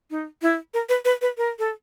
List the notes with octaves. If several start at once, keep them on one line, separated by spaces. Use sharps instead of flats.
D#4
E4
A#4
B4
B4
B4
A#4
A4